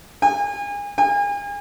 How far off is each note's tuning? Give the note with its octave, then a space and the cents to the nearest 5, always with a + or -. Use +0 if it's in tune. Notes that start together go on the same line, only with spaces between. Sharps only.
G#5 -30
G#5 -35